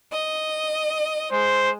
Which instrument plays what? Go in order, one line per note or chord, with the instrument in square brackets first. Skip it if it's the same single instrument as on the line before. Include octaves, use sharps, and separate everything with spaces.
[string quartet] D#5
[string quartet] G#3 [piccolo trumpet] C5